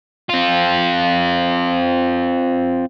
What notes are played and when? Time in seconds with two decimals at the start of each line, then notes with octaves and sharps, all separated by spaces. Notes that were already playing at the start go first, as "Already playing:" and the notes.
0.29 C4 F4